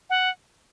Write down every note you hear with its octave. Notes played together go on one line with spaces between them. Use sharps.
F#5